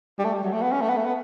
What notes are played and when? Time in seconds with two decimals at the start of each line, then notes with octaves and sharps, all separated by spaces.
0.19 G3
0.24 A3
0.34 G3
0.43 F#3
0.53 A3
0.62 B3
0.72 C#4
0.81 A3
0.89 B3
0.97 A3
1.05 B3